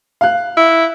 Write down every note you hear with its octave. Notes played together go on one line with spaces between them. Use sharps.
F5 F#6
E4